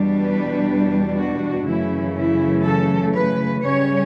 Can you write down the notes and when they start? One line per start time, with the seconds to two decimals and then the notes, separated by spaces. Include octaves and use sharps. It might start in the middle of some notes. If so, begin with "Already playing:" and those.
Already playing: E2 B2 G3 D4
0.18 B4
1.16 F#4
1.66 F#2 C#3 E3 A3 E4
2.16 E4
2.65 A4
3.14 B4
3.64 C#3 G3 C#4 C#5